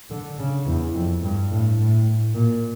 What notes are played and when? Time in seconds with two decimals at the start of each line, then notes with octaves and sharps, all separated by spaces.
0.10 D3
0.38 C#3
0.67 E2
0.94 F2
1.23 G2
1.50 A2
1.79 A2
2.34 A#2